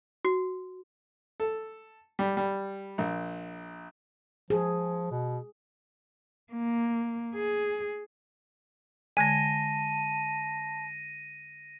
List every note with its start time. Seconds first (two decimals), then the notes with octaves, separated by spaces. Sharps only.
0.25 F#4
1.40 A4
2.19 G3
2.37 G3
2.98 A#1
4.50 F3 G#4
5.11 B2
6.53 A#3
7.34 G#4
9.17 D3 G#3 G#5 A5 A#6 D#7